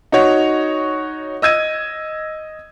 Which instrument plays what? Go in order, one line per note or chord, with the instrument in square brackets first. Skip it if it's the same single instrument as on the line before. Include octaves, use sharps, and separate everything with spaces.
[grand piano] D#4 F#4 C#5
D#5 E6 G#6 D#7